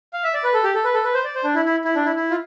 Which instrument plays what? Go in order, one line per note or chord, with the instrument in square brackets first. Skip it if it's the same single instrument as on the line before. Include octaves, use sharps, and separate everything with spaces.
[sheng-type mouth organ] F5
E5
D5
B4
A4
G4
A4
B4
A4
B4
C5
D5
C5
D4
E4
E4
E4
D4
E4
E4
F4